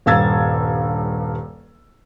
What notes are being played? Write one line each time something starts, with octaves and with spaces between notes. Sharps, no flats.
D#1 G2 F5 E6 G#6 A6